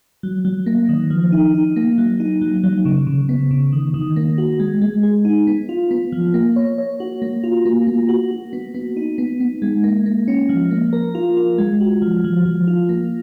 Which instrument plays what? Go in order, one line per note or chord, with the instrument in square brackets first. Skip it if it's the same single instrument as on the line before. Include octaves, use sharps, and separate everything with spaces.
[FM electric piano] F#3
F#3
A#3
D#3
F3
D#4
D#4
A#3
F#3
D#4
F#3
F#3
C#3
C#3
B3
C#3
D#3
D#3
A#3
F#4
G#3
G#3
G#4
D#4
B3
F4
B3
F3
A#3
C#5
C#5
F#4
A#3
F4
A#3
A#3
F#4
F#4
B3
B3
D#4
B3
B3
G#3
A#3
A#3
C#4
F3
A#3
A#4
F4
F4
G#3
F#4
F3
F3
F3
F4
A#3